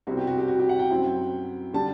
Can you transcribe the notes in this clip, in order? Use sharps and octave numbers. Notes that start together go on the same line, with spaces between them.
C2 B2 G3 C4 E4 F#4
G4
F#4
G4
F#4
G4
F#5
G5
F#2 F#3 C4 E4
D3 G3 A5